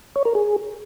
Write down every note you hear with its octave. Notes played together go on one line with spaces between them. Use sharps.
C#5
A#4
G#4